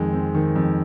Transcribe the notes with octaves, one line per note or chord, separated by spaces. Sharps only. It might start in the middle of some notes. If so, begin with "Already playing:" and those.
Already playing: F2 D#3 G#3
C4
D#3
F2